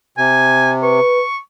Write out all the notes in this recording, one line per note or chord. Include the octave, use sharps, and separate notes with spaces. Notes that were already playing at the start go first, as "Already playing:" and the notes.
C3 G#5
B4 C#6